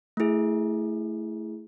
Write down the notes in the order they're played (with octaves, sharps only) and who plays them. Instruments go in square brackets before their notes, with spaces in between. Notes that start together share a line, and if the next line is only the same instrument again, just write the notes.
[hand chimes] A3 E4 G#4